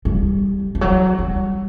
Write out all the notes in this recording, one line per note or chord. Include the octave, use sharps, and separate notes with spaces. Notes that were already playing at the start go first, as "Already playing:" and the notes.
G3
F3
F#3
G3